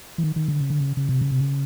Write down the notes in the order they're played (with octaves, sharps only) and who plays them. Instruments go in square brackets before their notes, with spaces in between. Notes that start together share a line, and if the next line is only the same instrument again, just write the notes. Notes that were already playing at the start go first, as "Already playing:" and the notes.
[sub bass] E3
D#3
D#3
D3
C#3
D3
C#3
C#3
C3
C#3
C3
C#3